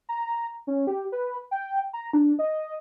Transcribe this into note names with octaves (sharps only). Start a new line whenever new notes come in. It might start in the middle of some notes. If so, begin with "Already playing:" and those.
A#5
C#4
G4
B4
G5
A#5
D4
D#5